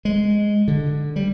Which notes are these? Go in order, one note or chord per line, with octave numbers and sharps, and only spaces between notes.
G#3
D3
G3